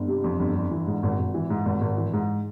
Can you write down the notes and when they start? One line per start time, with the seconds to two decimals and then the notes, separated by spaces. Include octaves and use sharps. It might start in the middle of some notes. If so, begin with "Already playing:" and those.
Already playing: G1
0.08 C3
0.24 F2
0.40 G1
0.55 G1
0.71 E3
0.87 G#2
1.03 G#1
1.19 G#1
1.34 E3
1.50 G#2
1.66 G#1
1.81 G#1
1.97 E3
2.13 G#2